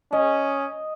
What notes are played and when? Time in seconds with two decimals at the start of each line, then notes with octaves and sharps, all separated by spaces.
0.13 C#4 D#5